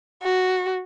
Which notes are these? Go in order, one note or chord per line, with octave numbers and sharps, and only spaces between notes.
F#4